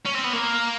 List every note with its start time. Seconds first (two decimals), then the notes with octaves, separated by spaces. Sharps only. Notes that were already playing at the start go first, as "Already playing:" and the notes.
0.06 C#4
0.15 C4
0.24 B3
0.33 A#3